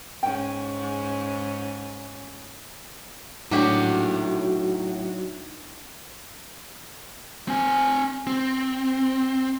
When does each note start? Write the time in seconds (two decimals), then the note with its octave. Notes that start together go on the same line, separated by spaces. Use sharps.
0.23 G#2 C#4 G5
3.51 A2 F#3 D4 D#4 F#4 G4 E5 F#5
7.48 C4 G#5
8.27 C4